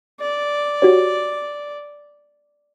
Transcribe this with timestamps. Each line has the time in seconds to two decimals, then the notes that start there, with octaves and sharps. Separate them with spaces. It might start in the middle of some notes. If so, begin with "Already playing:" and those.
0.20 D5
0.82 F#4 G4 C#5